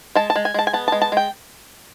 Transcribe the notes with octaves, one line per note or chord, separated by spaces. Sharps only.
G#3 A5
A5
G#3
G#5
G#3 A5
G#5
B3 A5
G#3 A5
A5
G#3 G5